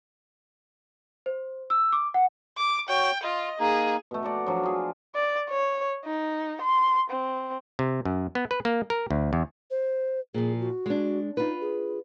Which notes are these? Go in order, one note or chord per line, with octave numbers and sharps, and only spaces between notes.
C5
E6
D6
F#5
D6
F#4 C#5 G5
F4 D#5
A#3 D#4 G#4
B2 A3
D5 F#5 A#5
F3 F#3 D4 F#4
F4 G#4
D5
C#5
D#4
C6
C4
C3
F#2
B3
B4
A#3
A#4
D2
E2
C5
A#2 F3 G#4
F#4
G#3 D4
D#4 F4 B4
G#4